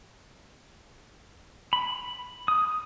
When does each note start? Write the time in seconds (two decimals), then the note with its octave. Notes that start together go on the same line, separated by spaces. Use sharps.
1.73 B5
2.48 D#6